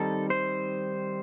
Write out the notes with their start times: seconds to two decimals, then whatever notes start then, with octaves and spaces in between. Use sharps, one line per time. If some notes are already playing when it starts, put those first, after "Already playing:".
Already playing: D#3 G3 C4 D#4 A4
0.30 C5